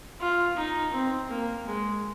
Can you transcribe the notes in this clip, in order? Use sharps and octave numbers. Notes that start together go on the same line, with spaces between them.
F4
D#4
C4
A#3
G#3